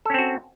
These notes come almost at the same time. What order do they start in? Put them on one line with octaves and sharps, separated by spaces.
A4 C#4 C4 F#4